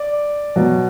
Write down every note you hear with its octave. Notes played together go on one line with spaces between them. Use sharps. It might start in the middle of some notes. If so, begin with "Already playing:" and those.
Already playing: D5
B2 F#3